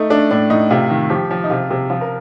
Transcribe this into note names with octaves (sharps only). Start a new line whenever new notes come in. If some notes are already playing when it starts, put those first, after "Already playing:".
Already playing: A3 D#4
A3 D4
A2 D4
A2 D#4
C3 F4
D#3
F3 G4
F3
D#4
C3 F4
C3
F3 F4
A#4